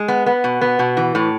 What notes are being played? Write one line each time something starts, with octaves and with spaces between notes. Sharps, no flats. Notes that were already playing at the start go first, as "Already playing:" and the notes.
Already playing: G#3
B3
B3
B2
B3
B2
E3
A2